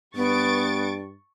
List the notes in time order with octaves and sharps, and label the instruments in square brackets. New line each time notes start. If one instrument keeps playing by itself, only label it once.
[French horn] G2 [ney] B3 [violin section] C#6 A6 D7